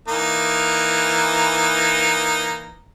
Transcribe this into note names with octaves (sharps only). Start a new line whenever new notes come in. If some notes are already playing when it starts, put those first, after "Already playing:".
E3 A#3 D#4